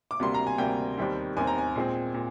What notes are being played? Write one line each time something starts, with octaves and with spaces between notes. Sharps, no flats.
D6
D2 C3 G3 A#3 C6
A#5
G#5
D2 C3 G3 A#3 G5
D#2 D#3 G3 C4
D#2 D#3 G3 C4 G#5
A#5
G#5
A#2 G#3 C4
A#2